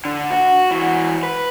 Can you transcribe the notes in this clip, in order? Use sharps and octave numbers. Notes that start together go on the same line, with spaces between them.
D3
F#4
E3 F#4
B4